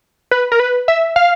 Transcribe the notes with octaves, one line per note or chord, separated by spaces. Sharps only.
B4
A#4
B4
E5
F5